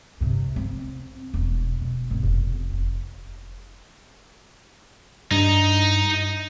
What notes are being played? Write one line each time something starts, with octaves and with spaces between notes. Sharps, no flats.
G2 C3
C4
E1
B2
G1
F1
G2 D#4